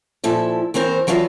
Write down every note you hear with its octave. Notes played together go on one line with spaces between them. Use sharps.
A#2 F3 E4 A4
D#2 E3 C4 A#4 C5
E3 F#3 D4 F4 E5